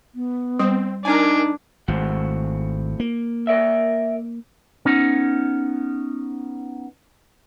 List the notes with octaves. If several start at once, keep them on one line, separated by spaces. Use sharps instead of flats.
B3
G3 C4
D4 D#4 A#4 G#5
G#1 A2 C4 F#4
A#3
A#4 D5 E5
B3 C#4 D#4